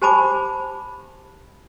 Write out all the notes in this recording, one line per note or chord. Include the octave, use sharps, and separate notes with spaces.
G4 C5 G#5 A5 B5 D6